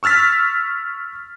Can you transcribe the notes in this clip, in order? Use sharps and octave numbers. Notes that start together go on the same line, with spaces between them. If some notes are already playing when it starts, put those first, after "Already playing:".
C#6 E6 F6 A6 B6